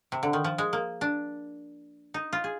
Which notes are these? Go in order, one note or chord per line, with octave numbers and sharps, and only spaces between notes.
C3
D3
D#3
F3
G#3
A#3
D4
D#4
F4
G#4